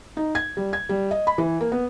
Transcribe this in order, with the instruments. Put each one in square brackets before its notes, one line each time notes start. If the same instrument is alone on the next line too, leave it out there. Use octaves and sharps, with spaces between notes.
[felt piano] D#4
G#6
G3
G#6
G3
D#5
B5
E3
A#3
B3